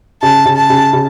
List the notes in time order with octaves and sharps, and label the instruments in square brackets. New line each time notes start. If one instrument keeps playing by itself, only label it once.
[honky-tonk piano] C#3 [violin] A5
[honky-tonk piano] C#3
[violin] A5
[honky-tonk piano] C#3
C#3